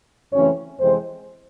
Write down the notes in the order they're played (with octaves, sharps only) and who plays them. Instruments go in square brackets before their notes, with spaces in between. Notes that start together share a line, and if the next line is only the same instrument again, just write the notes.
[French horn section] F#2 C#3 E3 A3 C4 C#4 C#5
F2 C3 E3 G#3 C4 C5